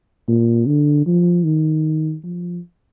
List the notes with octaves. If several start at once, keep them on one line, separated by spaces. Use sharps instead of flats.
A#2
D3
F3
D#3
F3